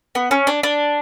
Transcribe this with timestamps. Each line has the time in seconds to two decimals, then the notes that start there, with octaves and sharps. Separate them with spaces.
0.15 B3
0.31 C#4
0.47 D4
0.63 D4